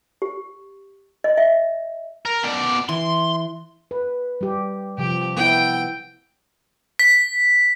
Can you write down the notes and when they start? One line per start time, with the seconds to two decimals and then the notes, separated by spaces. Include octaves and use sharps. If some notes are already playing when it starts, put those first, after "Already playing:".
0.22 G4
1.24 D#5
1.37 E5
2.25 A#4
2.43 B2 D5
2.89 E3 C6
3.91 B4
4.41 G3 G4
4.98 C3 F3 G4
5.37 B3 E4 G5
6.99 B6